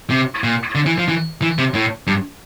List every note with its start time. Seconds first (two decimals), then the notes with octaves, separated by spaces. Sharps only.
0.10 C3
0.44 A#2
0.75 D3
0.86 E3
0.98 F3
1.08 E3
1.42 E3
1.58 C3
1.75 A2
2.07 G2